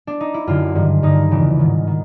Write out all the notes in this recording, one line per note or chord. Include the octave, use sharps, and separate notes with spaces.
D4
D#4
E4
F#2 D3 F4
G2 D#3
G2 D3 D#4
E2 C#3 E3
G#2 D#3
D#3